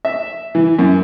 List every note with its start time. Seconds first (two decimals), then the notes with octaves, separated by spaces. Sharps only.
0.05 E5
0.55 E3
0.79 F#2